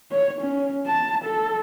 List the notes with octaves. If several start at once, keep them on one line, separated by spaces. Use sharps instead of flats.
C#5
C#4
A5
A4